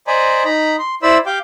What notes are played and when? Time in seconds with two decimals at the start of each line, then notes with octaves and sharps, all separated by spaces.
0.07 C5 D5 D#5 G#5 A#5 B5
0.45 D#4 A#5 B5
0.79 C6
1.03 E4 C5 D5 B5 E6
1.26 G4 F5 G5 D6 G6